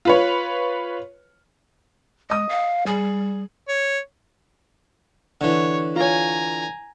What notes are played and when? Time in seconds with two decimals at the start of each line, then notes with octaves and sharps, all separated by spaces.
0.05 F4 B4 C#5
2.30 G#3 D#5 D#6
2.49 F5
2.86 G3 G#4
3.68 C#5
5.41 D3 E3 C#5
5.96 F4 C#5 G#5 A#5